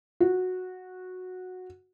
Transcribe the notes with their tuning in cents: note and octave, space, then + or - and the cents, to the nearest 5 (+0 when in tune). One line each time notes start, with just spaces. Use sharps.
F#4 -10